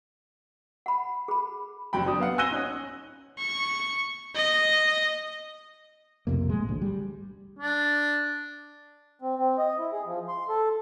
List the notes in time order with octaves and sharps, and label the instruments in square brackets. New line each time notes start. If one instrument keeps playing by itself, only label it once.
[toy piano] F#5 B5
G#4 B5
[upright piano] F#1 F#3 G3 G5 B5
F#3 D4 D#6
B3 F5 F#5
G#5 E6 F#6 A#6 D#7 G7
C#4 D#4
[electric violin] C#6
D#5
[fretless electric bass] B1 F2 C3 A#3
A2 G#3
A1 D2
G3
[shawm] D4
[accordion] C4
C4
D#5
E4
G#4
F3
C6
A4